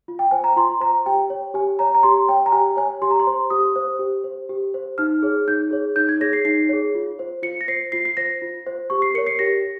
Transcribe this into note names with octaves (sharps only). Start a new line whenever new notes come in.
F4
G5
C5 G#5
A#5
F4 C6
C5 A#5
G4 G5
C#5
G4 G#5
C#5 A#5
A#5
G4 C6
C#5 G5
A#5
G4 G#5
C#5 G#5
G4 C6
A#5
C6
C5
G4 D#6
C5
G4
C5
G4
C5
D#4 F6
G#4 C#5
D#4 G6
G#4 C#5
D#4 G6
G#6
G#4 C#5 A#6
C7
D#4 C7
G#4 C#5
F4
C5
F4 C#7
A#6
C5 C7
F4 C7
C7
C5 A#6
F4
C5
G4 C#6
C7
A#4 C#5 C#7
C7
G4 A#6